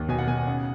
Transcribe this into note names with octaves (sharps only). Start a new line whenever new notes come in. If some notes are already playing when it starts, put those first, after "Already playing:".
Already playing: D#2
B2 G#5
F#5
B2 G#5
G#5
C#3 F#5